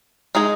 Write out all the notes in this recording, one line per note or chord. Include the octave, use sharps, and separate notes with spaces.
G#3 D#4 G#4